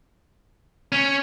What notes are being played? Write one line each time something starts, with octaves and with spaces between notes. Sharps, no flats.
C#4